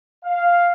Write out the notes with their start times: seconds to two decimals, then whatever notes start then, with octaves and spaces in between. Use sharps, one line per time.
0.24 F5